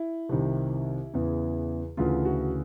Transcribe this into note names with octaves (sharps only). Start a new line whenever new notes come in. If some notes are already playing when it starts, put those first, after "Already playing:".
Already playing: E4
C2 C3 D#3
E2 C#3 E3
D2 C#3 E3 F4
F#4